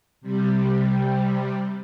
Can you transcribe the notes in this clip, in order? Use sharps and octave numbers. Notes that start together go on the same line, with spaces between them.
C3 G3